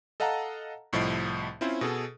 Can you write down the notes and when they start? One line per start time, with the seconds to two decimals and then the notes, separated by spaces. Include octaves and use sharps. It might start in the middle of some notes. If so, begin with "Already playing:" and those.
0.20 A4 D#5 F5 F#5 A5 A#5
0.93 C2 A2 F3 D#5 C7 D7
1.61 C4 C#4 E4 F4 C5
1.81 B2 G#4 A4